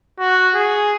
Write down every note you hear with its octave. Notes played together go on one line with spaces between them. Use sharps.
F#4
G#4